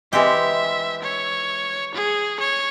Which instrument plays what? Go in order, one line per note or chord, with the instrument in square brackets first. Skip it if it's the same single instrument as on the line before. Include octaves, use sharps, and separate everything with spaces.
[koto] E3 G#3 C4 G4 [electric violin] E5
[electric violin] C#5
G#4
C#5